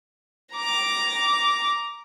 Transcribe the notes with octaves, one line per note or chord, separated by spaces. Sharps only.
A#5 D6